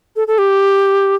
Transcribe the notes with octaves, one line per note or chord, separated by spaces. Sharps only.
A4
A4
G4